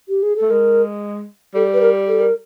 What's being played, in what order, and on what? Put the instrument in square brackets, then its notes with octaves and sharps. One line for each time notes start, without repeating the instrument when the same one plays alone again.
[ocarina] G4
G#4
A4
[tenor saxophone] A3
[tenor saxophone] G#3 [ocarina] A#4
[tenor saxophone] G3 [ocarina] A4
[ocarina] B4
A#4
A4
A#4